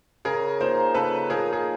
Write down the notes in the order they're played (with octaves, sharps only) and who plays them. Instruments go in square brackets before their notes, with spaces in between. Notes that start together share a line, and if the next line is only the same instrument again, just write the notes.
[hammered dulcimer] C#3 [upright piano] G#4 A#4
[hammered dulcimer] F3 A#3 D#4 [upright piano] A#4 C5
[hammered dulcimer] C#3 [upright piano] A4 B4
[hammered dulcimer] F3 A#3 D#4 [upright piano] G#4 A#4
[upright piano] G#4